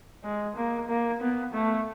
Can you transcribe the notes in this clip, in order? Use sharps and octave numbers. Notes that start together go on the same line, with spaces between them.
G#3
A#3
A#3
B3
A3